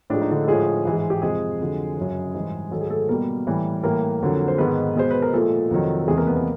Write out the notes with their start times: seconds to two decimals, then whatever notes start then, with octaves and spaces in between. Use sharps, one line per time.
0.10 A2 F3 G#3 D4
0.21 D#4
0.31 D3 D4
0.43 A4
0.48 A2 F3 G#3 G#4
0.85 G#2 E3 G#3
1.10 G4
1.22 F2 C3 F3 G#3 G#4
1.60 F2 D3 F#3
1.97 F#2 C#3 F#3
2.35 G#2 E3 G3
2.71 G#2 D#3 F#3 A4
2.81 G#4
2.90 A3 A4
3.09 B2 G3 A#3 A#4
3.47 A2 E3 G3
3.83 A2 E3 G3 A#3 A#4
4.21 F2 D3 F#3
4.48 C5
4.58 G#2 D#3 G#3 B3 B4
4.96 B2 G#3 C5
5.11 B4
5.22 A#4
5.33 A#2 F3 G#3 A3 A4
5.71 F2 C3 D#3 F#3
5.99 A4
6.08 E2 C3 E3 G#3 G#4
6.18 A#3 A#4
6.27 B3 B4
6.37 A#3 A#4